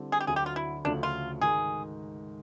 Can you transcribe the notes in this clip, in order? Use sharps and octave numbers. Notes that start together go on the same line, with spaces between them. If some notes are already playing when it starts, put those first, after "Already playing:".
Already playing: D3 G3 C4 E4 A4
G#4
G4
D2 D3 F#3 G#4
G4
F4
E4
D2 C#3 F3 A3 D4
F4
G#2 D#3 G#3 G#4